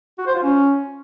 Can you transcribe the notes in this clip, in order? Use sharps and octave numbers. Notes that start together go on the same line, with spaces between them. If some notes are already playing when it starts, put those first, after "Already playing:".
F#4
C5
F4
C#4